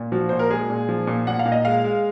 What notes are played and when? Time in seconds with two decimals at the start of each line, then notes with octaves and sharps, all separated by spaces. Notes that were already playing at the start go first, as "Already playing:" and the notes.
Already playing: A#2
0.12 F3 F#4
0.29 A#2 C5
0.39 A#4
0.50 G#3 G#4
0.70 A#2
0.89 F3
1.07 A#2
1.27 A#2 F#5
1.39 F5
1.46 A#2
1.52 D#5
1.65 G#3 F5
1.84 G#3